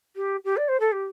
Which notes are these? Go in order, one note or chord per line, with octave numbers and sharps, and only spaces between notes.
G4
G4
D5
C5
A4
G4